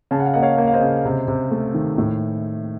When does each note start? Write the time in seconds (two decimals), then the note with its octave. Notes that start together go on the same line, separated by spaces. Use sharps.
0.11 C#3 A5
0.20 F#5
0.26 F5
0.34 A#3 D#5 F#5
0.42 C#5 F5
0.58 A#3
0.67 F5
0.73 C5 D#5
0.81 C#3
1.05 C3
1.28 C3
1.51 A3
1.74 D#3
1.98 A2